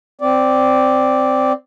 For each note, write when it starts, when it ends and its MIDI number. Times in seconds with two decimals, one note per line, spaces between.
0.21 1.52 60
0.21 1.52 74